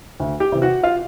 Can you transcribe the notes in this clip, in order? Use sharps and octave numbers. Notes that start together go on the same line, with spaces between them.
D2
G4 G5
C3 E3
F#4 F#5
F4 F5